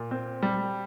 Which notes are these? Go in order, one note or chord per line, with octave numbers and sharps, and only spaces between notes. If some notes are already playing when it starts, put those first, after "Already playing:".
Already playing: A#2
C4
G3